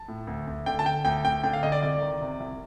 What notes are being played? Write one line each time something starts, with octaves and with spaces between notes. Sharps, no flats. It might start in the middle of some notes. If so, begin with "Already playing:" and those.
Already playing: A5
A2
D2
D2
D3 G5
A5
D3 G5
D2 G5
D2 G5
D3 G5
F5
D3 D#5
D5
C2 D5
D#3
C3
C2